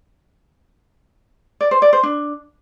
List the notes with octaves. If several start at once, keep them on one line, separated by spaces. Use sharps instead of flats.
D5
C5
D5
C5
D4